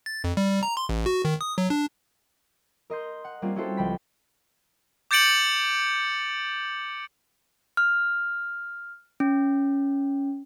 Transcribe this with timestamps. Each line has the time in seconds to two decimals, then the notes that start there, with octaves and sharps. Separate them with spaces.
0.06 A6
0.24 F2
0.37 G3
0.63 A#5
0.77 C6
0.89 A1
1.06 F#4
1.25 D#3
1.41 D#6
1.58 F#3
1.70 D4
2.90 A#4 D#5 C6 G6
3.24 F#5
3.42 G3 A#3 C4 C#4 F4
3.56 C#4 E4 F#4 G4 A4 C5
3.77 C#2 F3 G5 B5 B6
5.11 D6 G6 A6 C#7 D7 F#7
7.77 F6
9.20 C#4